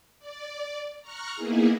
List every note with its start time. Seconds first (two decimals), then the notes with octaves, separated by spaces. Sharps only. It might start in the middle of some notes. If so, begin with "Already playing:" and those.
0.19 D5
1.02 A#5 C#6 F6 F#6
1.35 A#3 B3 D#4 E4 G#4